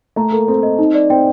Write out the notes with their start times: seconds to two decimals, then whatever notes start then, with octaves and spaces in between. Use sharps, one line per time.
0.16 A3 A#5
0.32 A#3 A4
0.48 C4 A4
0.63 D#5
0.79 D#4
0.94 D5
1.10 C4 G5